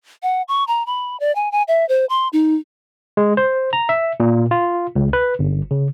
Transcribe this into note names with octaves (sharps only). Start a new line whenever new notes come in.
F#5
C#6
A#5
B5
D5
G#5
G#5
E5
C5
C6
D#4
G#3
C5
A#5
E5
A#2
F4
C#2
B4
G1
C#3